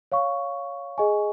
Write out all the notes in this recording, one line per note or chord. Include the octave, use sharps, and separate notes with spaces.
C#5 F5 C#6
G#4 D#5 G#5 C#6